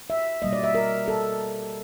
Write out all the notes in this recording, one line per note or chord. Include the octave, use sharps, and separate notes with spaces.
E5
B2 G3 A#3 D#5
D5
E5
A#4
A4